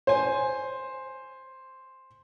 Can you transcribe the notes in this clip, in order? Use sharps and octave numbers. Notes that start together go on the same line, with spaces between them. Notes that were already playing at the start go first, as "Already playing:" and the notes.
C5 G#5